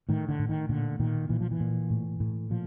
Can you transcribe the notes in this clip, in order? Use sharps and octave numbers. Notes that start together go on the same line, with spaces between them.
A2 D#3
D3
A2
D#3
A#2 D3
A#2 D#3
A#2 E3
F3
E3
A#2
A2
A2
A#2 F3